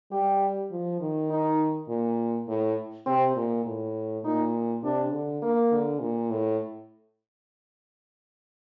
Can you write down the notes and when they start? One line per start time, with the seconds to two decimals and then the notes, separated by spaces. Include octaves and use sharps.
0.12 G3 G4
0.71 F3
1.00 D#3
1.31 D#4
1.88 A#2
2.48 A2
3.06 C3 C4
3.36 A#2
3.65 A2
4.24 A#2 D#4
4.83 C3 D4
5.12 D3
5.42 A#3
5.71 D3
6.01 A#2
6.30 A2